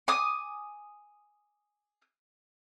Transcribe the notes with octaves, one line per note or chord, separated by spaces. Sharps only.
G#5 D6 D#6